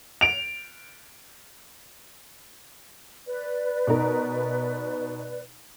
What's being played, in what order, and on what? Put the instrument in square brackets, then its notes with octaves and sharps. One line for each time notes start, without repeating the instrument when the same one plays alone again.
[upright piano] D7 F7
[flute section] B4 D5
[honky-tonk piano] B2 D#4 A#4